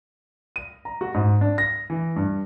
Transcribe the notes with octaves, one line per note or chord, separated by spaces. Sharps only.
D#7
A#5
F#4
G#2
D4
A#6
E3
G2